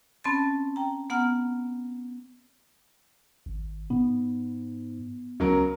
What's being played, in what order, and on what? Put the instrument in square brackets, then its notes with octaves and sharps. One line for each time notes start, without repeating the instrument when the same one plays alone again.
[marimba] C4 C#4 A5 B5 C6 A6
G5 A#5
B3 F#5 A#5 F6
[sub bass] G#1
[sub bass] G#2 [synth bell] B3
[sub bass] C#2 [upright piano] C#3 F#3 A#4